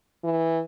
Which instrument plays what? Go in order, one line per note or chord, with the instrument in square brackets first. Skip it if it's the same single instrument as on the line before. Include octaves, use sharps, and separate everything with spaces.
[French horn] E3